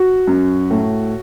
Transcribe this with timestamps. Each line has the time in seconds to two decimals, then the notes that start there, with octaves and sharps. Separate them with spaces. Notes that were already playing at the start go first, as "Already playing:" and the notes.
Already playing: F#4
0.27 F#2
0.70 A2